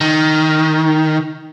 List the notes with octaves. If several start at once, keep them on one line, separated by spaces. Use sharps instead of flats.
D#3